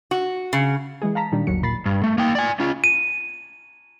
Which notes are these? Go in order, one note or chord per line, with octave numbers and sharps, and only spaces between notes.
F#4
C#3
E3 G#3 G#4
F5 A5 A#5 B6
A#2 D#3 G3 D4
G1 D#2 F#3 C#7
A#2 B5 A6 C7
G2
A3
A#3 G5
D5 G#5
C#4 F4
D#7